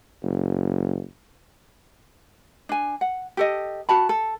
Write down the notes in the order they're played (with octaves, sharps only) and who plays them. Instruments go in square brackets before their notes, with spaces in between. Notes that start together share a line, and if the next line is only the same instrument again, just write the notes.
[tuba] F#1
[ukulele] D4 G#5
F#5
G4 A4 D#5
F#4 A5 B5
A4